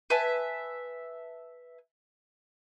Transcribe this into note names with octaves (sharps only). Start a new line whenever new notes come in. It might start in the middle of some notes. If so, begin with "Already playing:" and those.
B4 E5 G#5 A5